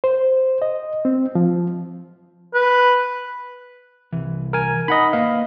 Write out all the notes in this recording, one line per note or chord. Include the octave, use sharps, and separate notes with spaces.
C5
D#5
C4
F3
B4
C2 E3
A#4 G#5
D#4 D#5 F#5 B5
A#3 B4 D#5 F5